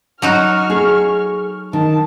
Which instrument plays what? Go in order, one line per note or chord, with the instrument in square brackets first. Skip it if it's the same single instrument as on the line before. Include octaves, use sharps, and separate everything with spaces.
[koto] F#3 D#4 F#4 [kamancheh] C#6 F6
[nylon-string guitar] G#4 A4
[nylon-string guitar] D#3 [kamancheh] A5